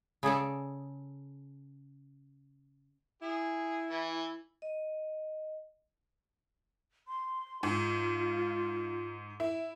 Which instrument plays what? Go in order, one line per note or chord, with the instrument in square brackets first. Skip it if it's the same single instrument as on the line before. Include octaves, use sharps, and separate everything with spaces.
[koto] C#3 G#4 A4 D5
[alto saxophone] E4 [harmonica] G#4
[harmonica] E3
[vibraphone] D#5
[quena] C6
[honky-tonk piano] G#2 [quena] F4
[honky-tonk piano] E4